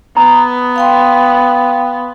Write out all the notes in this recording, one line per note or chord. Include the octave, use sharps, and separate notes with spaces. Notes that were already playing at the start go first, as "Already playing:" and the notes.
B3 A#5 E6
F5 G5 C6